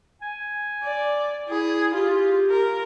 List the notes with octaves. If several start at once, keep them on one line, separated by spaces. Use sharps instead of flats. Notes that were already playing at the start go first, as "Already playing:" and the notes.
G#5
D5
E4 G#4
F4 G4
A#4